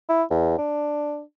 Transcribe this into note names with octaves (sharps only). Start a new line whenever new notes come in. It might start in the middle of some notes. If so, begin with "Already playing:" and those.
E4
E2
D4